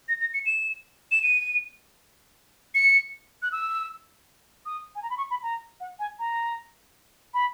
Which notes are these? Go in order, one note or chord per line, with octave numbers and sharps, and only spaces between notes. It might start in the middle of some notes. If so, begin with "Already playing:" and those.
A#6
A#6
C#7
E7
E7
D#7
C#7
F#6
E6
D#6
G#5
A#5
B5
C#6
B5
A#5
F#5
G#5
A#5
B5